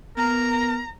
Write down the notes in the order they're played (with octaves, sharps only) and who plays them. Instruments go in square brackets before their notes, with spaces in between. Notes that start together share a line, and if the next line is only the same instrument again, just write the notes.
[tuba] B3 [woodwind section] A#4 [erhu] A#5